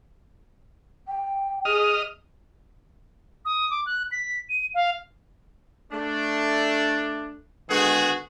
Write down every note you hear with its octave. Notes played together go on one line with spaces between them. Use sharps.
G5
G#4 D#5 D#6 F6
D#6
D6
F#6
B6
D#7
F5
A3 D4
D3 D#3 G#3 B3 F#4 G#4